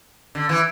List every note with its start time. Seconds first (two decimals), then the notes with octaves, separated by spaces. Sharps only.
0.35 D3
0.49 E3